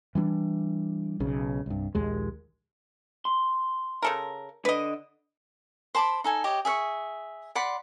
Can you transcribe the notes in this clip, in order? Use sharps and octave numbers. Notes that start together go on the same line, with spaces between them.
E3 G3 B3 D4
B1 C#3
C2 G2
A#1 D#2 G#3
C6
C#3 A4 A#4
D3 B4 D#5
C5 A5 B5 D6
D#4 A4 G#5
G4 C#5 D#5
G#4 E5 F5 C#6
D5 F#5 B5 C6